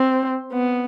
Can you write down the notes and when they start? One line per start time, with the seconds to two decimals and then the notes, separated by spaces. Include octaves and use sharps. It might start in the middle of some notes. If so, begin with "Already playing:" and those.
Already playing: C4
0.53 B3